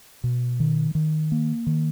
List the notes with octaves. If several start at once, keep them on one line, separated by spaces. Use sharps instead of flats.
B2
D#3
D#3
A#3
D#3